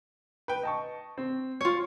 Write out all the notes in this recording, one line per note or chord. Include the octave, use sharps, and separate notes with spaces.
B4 G5
D#5 A5 C#6
C4
F4 C#5 C#7